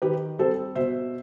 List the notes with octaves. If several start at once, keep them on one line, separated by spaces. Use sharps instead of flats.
D#3 G4 B4
G3 C4 A4 C5
B2 C5 E5